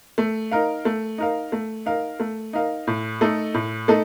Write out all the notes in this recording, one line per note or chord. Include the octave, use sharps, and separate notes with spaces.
A3
D#4 A#4 F5
A3
D#4 A#4 F5
A3
D#4 A#4 F5
A3
D#4 A#4 F5
A2
A3 D#4 A4 D#5
A2
A3 D#4 A4